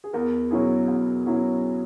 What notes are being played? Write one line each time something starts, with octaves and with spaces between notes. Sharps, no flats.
G#4
E2 A#4
B2 F#3 C#4 E4 G#4
E2
B2 F#3 C#4 E4